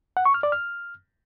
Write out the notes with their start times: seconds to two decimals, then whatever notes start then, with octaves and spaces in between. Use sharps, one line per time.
0.17 F#5
0.25 C#6
0.34 F6
0.43 D5
0.52 F6